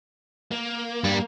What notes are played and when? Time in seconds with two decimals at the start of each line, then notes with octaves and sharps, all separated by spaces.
0.51 A#3
1.04 G2 G3